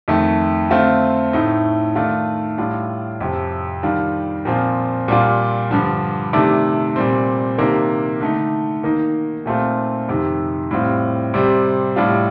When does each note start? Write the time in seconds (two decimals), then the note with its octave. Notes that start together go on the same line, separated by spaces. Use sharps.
0.08 F2 D#3 A3
0.70 D3 A3 C4 F4
1.33 A2 A3 D#4
1.95 D#3 A3 D4 F4
2.58 A2 G3 D4 F4
3.21 F2 C3 F3
3.83 D#3 G3 D4 F4
4.45 A#2 F3 C4 F4
5.08 A#2 G3 D4 F4
5.71 G2 D3 F3
6.33 C3 D#3 A3 D4
6.96 A#2 G3 C4
7.58 C3 D#3 A#3 D4
8.21 D3 A3 D#4
8.83 D#3 A#3 D#4
9.46 A#2 A3 C4 F4
10.08 F2 C3 D#3
10.71 A2 G3 C4 F4
11.34 C3 G3 C4
11.96 A2 G3 D4 F4